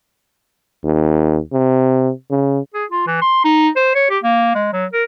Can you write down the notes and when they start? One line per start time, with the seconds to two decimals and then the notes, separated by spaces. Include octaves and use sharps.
0.84 D#2
1.53 C3
2.30 C#3
2.74 G#4
2.91 F4
3.07 E3
3.22 C6
3.44 D#4
3.76 C5
3.95 C#5
4.10 G4
4.23 A#3
4.55 G#3
4.73 F#3
4.93 A#4